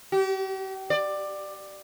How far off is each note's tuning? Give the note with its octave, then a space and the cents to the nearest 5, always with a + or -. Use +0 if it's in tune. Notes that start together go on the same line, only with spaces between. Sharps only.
G4 -40
D5 +15